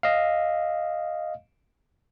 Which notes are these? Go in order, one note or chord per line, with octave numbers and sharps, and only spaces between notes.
D#5 F5